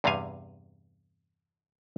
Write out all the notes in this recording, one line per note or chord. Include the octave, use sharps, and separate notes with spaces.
E2 G2 C3 G3 F5 G#5